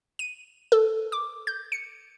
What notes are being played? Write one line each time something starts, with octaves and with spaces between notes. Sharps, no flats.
D#7
A4
D6
G6
C#7